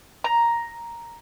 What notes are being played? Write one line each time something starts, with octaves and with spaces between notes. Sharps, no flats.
A#5